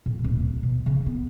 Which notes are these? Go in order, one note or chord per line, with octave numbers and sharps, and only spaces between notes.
A#2
D1
D4
B2
C#3
B3